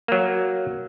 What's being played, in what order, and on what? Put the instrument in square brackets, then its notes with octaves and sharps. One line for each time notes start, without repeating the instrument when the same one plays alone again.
[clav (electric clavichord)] F#3 A#3